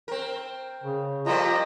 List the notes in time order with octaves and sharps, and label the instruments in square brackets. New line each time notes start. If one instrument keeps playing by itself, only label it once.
[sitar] C4 A#4
[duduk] C#3
[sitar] F2 G3 A#3 [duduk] F4 [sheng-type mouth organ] D#5 A#5